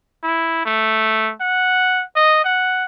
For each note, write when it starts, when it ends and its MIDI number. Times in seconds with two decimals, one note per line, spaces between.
0.23 0.62 64
0.65 1.32 57
1.41 2.03 78
2.16 2.43 75
2.44 2.85 78